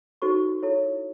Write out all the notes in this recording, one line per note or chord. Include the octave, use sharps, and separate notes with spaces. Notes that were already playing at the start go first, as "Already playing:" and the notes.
D#4 F#4 A4 C5 C#6
E4 A4 C#5